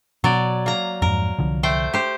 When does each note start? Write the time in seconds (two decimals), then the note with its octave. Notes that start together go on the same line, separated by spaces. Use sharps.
0.24 B2 F#3 D5
0.66 A#3 A#5
1.02 F2 G#2 A#4
1.39 C2 D3 F3
1.63 A3 C5 G5
1.93 G4 C5